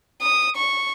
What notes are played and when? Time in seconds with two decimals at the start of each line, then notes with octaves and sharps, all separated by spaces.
0.22 D#6
0.57 C#6